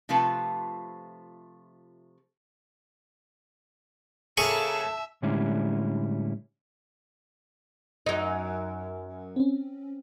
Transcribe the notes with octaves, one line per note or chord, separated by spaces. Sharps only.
C3 F3 A3 F4 A4 B4
C#3 A#3 G#4 A4 E5 A5 C#6
A2 D3 G3 G#3 C#4 E4
F#2 D#4
C4 C#4